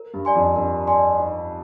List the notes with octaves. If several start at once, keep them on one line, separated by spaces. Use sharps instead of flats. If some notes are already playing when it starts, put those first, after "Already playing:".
Already playing: A#4
G2
D5 G#5 C6
F2
G2 A#4
D5 G#5 C6
D#4